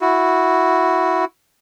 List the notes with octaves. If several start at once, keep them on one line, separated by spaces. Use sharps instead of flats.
E4 F#4